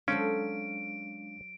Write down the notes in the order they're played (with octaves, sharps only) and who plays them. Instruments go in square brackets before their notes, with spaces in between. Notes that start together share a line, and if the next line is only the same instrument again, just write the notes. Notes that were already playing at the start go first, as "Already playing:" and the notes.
[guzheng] F#3 A4 C5 [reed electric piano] G#3 D4 F5 [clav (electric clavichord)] C#4 [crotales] D7